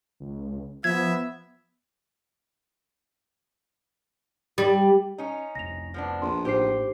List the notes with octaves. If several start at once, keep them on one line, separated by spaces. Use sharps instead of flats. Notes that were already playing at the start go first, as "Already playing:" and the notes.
C#2
F3 B3 E5 G#6
G3
C#4 D#4
F1 C2 A#6 F7
F3 B3 D4
A#1 C6
A1 A2 D#4 G4 C5 C7